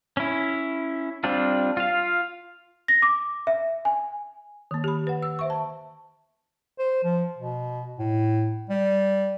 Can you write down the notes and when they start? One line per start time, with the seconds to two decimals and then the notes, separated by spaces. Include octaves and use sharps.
0.17 C#4 E4
1.24 G3 C4 D4 F4
1.77 F4 F5
2.88 A#6
3.02 D6
3.47 E5
3.85 G#5
4.71 D#3 A#3
4.84 G4 B5
5.07 B4 F#5
5.23 E6
5.39 C5 E5 C#6
5.50 A5
6.79 C5
7.04 F3
7.38 B2
7.99 A2
8.69 G3